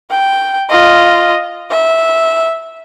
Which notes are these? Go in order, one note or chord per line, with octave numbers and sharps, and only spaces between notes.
G5
F4 D#5
E5